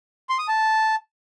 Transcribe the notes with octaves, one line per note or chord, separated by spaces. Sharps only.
C6
D#6
A5